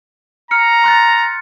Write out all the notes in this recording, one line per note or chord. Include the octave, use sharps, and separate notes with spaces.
A#5 F6 C#7
C6 F#6 A6